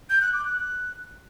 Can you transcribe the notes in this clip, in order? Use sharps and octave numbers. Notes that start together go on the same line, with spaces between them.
G6
F#6
D6
F#6